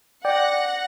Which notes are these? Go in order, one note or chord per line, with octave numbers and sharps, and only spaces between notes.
D5 F#5 G5 A#6